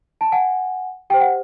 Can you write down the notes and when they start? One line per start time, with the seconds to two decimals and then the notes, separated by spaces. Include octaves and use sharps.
0.21 A5
0.32 F#5 G#5
1.10 G4 C5 G5
1.20 F#5